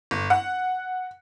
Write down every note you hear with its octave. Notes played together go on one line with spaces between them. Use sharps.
G1
F#5